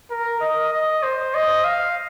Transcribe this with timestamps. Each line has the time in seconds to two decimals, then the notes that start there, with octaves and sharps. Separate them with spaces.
0.10 A#4
0.41 D#5
0.73 D#5
1.03 C5
1.35 D#5
1.64 F5